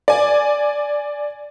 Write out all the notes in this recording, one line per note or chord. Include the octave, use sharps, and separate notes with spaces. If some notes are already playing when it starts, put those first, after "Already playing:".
D5 G#5